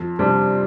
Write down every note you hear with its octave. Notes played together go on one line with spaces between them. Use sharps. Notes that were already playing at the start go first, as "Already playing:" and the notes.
Already playing: F2
C3 G3 D4